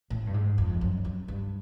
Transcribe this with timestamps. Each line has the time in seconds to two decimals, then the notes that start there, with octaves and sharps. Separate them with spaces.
0.10 A2
0.27 G2
0.34 G#2
0.58 F2
0.81 F#2
1.05 F#2
1.28 G2